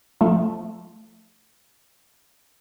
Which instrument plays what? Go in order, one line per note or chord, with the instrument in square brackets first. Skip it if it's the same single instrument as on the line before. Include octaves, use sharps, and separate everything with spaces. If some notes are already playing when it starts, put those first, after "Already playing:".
[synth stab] F3 A3